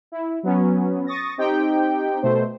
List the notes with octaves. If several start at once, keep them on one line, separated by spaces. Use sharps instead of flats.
E4
F#3 B3 C#4
C#6 D#6 A6 A#6
C4 D#4 G4 G5
B2 A3 C5